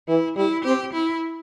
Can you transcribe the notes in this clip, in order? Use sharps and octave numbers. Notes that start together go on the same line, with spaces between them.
E3 E4
G3 E4
C4 G4
E4